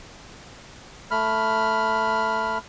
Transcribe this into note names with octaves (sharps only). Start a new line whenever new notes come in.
A3 B5 F6